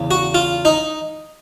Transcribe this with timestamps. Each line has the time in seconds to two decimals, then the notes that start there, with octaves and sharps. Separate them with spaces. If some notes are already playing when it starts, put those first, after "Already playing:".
Already playing: E2 C#3
0.11 F#4
0.34 F4
0.65 D#4